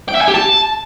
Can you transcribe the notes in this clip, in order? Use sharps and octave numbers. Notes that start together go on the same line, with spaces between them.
G5
E5
G#5
G4
A5